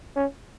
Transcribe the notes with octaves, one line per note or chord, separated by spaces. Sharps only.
C#4